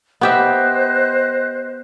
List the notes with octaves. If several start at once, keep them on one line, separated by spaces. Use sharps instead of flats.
B3 G4 C5 D#5 E5 F#6